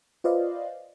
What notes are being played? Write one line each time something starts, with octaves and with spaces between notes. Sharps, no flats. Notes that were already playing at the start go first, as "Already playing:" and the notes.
F4 B4 C5 D5 D#5 F5